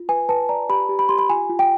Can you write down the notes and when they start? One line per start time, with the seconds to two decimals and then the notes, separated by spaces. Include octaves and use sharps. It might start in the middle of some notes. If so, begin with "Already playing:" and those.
Already playing: F4
0.09 B4 G#5
0.29 B4 A5
0.49 D5 A#5
0.69 G4 B5
0.89 G4
0.99 B5
1.09 G4 C6
1.19 B5
1.29 F4 G#5
1.50 F4
1.59 G5